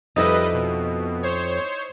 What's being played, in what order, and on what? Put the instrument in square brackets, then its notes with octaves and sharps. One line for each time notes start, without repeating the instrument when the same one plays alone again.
[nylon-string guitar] F2 [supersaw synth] G3 B4 D#5 [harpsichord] D#4 E4
[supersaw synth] B2
C5 C#5